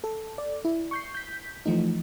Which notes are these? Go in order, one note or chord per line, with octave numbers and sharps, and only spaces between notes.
A4
D5
E4
C#6 G6 C7
G6 B6
E3 F3 A3 D#4